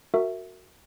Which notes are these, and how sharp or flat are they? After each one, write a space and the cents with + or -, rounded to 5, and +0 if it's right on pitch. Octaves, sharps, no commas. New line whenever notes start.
F#4 +0 A#4 -25 E5 +0